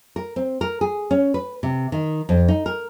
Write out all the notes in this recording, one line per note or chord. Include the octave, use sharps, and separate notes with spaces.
A#4
C4
A#4
G#4
C#4
B4
C3
D#3
F2
D#4
A#4